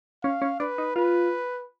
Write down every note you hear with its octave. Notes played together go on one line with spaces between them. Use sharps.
C#4 F5
C#4
D4 B4
D#4
F4 B4